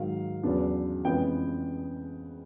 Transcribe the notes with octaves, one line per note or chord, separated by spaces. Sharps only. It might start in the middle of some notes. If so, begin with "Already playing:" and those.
Already playing: G#2 D#3 F#3 F5
E2 C#3 F#3 B3 D4
F2 C#3 E3 G#3 B3 G5